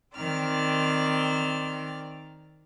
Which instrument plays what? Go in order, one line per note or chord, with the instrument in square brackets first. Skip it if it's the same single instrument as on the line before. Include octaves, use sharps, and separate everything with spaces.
[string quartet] D#3 C4 D5 F6